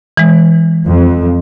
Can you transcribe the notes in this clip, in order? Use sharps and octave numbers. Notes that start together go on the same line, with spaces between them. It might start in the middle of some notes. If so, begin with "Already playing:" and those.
E3 G#3
F2